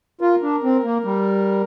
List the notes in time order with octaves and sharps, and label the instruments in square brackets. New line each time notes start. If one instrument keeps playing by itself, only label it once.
[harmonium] F4 [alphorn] A#4
[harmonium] D4
C4
A#3
G3